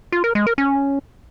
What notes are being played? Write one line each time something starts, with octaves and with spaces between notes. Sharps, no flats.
F4
A#4
G#3
A#4
C#4